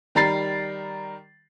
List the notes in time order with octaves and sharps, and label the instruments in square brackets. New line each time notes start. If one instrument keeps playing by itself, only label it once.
[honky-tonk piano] D#3 G3 A#5 B5 A6 C7